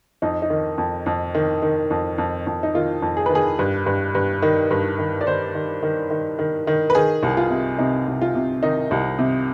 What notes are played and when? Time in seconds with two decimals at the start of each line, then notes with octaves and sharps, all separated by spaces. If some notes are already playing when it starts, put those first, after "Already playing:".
0.22 F2 D#4
0.42 D#4
0.50 D#3
0.78 F2
1.06 F2
1.35 D#3
1.62 D#3
1.90 F2
2.18 F2
2.47 F2
2.63 D#4
2.74 D#3 F4
3.02 F2
3.17 G#4
3.26 D#3 B4
3.35 G#4
3.59 G2
3.86 G2
4.15 G2
4.42 D#3
4.71 G2
4.99 D#3
5.21 D5
5.27 D#3 C5
5.55 D#3
5.83 D#3
6.10 D#3
6.39 D#3
6.67 D#3
6.90 B4
6.95 D#3 G#4
7.23 C2
7.37 F4
7.51 C3
7.78 C3 D#4
8.07 C2
8.21 F4
8.35 C3
8.63 D#3 D#4
8.91 C2
9.19 C3